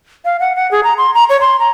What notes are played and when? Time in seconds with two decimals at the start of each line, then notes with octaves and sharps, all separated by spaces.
0.25 F5
0.40 F#5
0.55 F#5
0.71 G#4
0.84 A#5
0.98 C6
1.14 A#5
1.29 C#5
1.41 C6
1.59 A#5